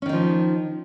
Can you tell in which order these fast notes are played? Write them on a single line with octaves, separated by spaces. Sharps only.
C#4 D#3 D#4 F3